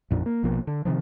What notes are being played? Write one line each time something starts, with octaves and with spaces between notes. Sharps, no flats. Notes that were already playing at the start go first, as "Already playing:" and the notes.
A1 F2 A#2 D4
A#3
A#1 B2 F3 A#3
D3
C3 D#3 F3